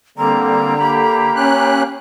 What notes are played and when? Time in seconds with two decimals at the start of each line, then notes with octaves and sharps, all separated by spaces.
0.18 D3 G3 A#3 C4 A#5
0.80 A#3 G4 B5
1.36 C#4 F#6